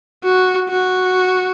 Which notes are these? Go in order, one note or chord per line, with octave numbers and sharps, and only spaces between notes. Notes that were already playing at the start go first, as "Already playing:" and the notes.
F#4
F#4